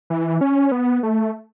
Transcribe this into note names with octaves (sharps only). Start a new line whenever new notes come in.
E3
C#4
B3
A3